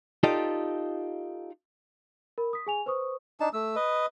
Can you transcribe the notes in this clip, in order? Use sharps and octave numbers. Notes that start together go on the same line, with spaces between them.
D#4 F4 G4 A4 D5 D#5
A#4 B5
D#6 B6
G#4 G#5 F7
B4 C5 C#6 D#6
D4 D#4 A5
A3 E6
B4 D#5